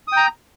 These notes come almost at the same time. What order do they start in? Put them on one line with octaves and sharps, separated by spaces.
D#6 G5 A#5